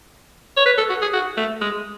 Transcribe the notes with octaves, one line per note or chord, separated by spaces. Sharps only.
C#5
B4
A4
F#4
G#4
F#4
A3
G#3